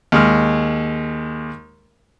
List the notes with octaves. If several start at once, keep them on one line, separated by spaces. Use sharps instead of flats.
D#2 G#3 F6